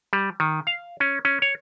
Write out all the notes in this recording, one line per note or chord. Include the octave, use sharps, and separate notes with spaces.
G3
D#3
F5
C#4
C#4
C#5